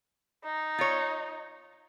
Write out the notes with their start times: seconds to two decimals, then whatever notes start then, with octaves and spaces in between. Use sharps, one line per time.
0.44 D#4
0.79 F4 C#5